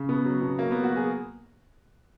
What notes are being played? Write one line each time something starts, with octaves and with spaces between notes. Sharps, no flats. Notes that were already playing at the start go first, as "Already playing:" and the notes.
Already playing: C#3
B2 B3
F#3
B2
F#3 A#3
F#3 B3
F#4
F#3 G#4